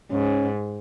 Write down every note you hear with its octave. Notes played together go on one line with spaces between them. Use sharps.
G#2 C#4